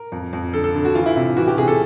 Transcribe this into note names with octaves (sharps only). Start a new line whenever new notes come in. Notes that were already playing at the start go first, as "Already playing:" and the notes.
Already playing: A#4
F2
F2
D3 A4
A4
D3
F#4
E3 F4
E4
C3 E4
E3 F#4
G4
C3 G#4
A4